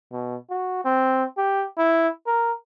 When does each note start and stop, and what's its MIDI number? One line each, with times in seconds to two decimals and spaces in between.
0.12 0.36 47
0.50 0.83 66
0.85 1.24 60
1.37 1.65 67
1.78 2.08 64
2.27 2.52 70